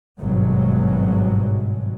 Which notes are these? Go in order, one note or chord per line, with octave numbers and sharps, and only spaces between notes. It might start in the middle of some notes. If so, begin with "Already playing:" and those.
G#1 G2 B2 F#3 G#3